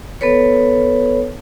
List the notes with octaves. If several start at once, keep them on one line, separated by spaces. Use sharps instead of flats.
B3 A4 B4 C#5